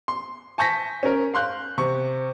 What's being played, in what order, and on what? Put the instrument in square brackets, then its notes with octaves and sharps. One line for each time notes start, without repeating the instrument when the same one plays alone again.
[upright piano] C6
G#5 A5 C#6 G6 A#6 B6
C#4 A#4
F5 C6 F#6 G6
C3 C#6